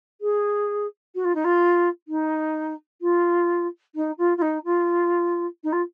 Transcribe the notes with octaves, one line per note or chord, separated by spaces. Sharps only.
G#4
F#4
F4
D#4
F4
D#4
F4
D#4
F4
F4
D#4
F4
D#4
F4